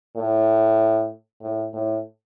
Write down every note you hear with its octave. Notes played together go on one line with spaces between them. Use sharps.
A2
A2
A2